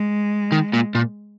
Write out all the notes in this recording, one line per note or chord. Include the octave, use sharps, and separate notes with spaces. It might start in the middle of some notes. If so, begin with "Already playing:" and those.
Already playing: G#3
D#3
A#2
A#2